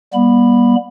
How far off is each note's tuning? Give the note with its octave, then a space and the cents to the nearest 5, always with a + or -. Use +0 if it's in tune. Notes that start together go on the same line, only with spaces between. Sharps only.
G3 +0 B3 -40 B5 +0